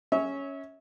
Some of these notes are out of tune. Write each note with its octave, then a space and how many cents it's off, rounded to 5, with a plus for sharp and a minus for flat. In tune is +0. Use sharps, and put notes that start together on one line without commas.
C#4 +0 C#5 +0 E5 -30